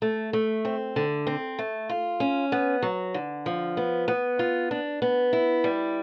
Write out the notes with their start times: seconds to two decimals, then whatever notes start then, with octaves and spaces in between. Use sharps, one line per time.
0.02 A3
0.33 A3
0.65 C4
0.96 D3
1.27 C4
1.59 A3
1.89 F4
2.20 C#4
2.52 B3
2.82 F#3
3.14 D3
3.46 F3
3.77 B3
4.08 B3
4.39 F4
4.71 D4
5.02 B3
5.33 E4
5.64 G3